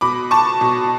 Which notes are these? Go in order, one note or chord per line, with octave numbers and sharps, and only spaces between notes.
B2 B5 D6
A5 C#6
B2